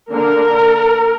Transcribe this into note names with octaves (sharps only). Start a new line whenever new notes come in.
D3 A#3 D4 A#4